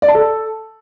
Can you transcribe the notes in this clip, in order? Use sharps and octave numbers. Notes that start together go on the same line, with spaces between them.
D5
A5
A4